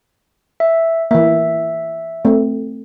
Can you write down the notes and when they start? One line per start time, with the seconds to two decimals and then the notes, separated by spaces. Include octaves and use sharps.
0.60 E5
1.11 E3 A#3 E5
2.25 A3 C4